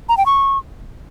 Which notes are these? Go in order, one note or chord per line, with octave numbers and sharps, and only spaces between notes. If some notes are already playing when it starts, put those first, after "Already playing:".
A#5
G5
C#6